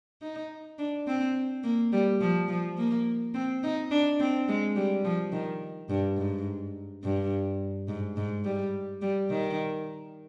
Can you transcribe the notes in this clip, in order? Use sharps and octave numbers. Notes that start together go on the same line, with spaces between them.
D#4
D4
C4
A#3
G3
F3
F3
A#3
C4
D#4
D4
C4
G#3
G3
F3
D#3
G2
G#2
G2
G#2
G#2
G3
G3
D#3